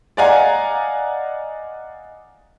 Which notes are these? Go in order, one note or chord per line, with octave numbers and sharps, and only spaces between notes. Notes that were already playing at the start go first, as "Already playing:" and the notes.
D5 D#5 F5 F#5 G#5 A#5